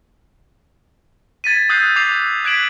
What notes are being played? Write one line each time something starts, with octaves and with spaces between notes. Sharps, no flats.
G#6 A6 B6 D#7
D#6 E6 F#6 G6 A6 C7
D6 G6 A6 C7 F7
F#6 G#6 B6 D7 E7 F#7